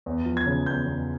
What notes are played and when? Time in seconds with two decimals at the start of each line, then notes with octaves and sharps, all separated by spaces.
0.06 E2
0.26 F3
0.37 G#6
0.46 C#3
0.66 E2 G6
0.87 E2